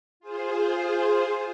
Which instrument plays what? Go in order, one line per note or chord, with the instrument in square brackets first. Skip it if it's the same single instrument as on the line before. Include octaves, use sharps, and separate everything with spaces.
[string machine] F4 G#4 C5